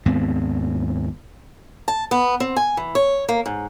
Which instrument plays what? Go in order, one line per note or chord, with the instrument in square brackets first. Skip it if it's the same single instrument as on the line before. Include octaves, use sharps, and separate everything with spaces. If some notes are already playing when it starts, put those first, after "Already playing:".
[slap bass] D#2 G#2 B3 C4
[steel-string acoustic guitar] A5
B3
C4
G#5
E3
C#5
A#3
G#2